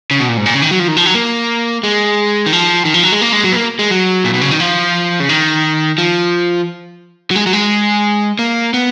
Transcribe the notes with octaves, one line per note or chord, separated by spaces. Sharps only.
C#3
B2
A#2
G#2
A#2
C#3
D#3
F#3
F3
D#3
F3
F#3
A#3
G#3
D#3
F3
D#3
F3
F#3
G#3
A#3
G#3
F#3
B3
A#3
G#3
F#3
A#2
B2
C#3
D#3
F3
C#3
D#3
F3
F#3
G#3
F#3
G#3
A#3
B3